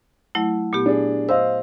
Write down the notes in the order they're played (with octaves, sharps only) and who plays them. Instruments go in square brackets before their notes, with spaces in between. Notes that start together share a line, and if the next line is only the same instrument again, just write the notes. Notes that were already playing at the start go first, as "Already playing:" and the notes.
[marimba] F#3 A3 E4
A#2 B3 G4
[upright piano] D4 G#4
[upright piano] C5 D#5 F5 [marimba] E6